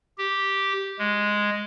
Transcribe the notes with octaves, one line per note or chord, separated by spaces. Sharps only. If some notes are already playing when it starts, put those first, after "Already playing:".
G4
G#3